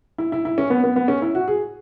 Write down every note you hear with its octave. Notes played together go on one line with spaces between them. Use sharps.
E4
E4
E4
C#4
B3
B3
B3
C#4
E4
F#4
G#4